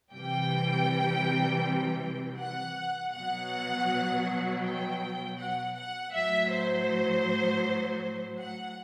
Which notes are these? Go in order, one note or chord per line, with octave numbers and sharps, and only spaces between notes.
C3 E3 G3 G5
F#5
B2 F#3 F#5
G5
F#5
F#5
A2 F#3 E5
C5
F#5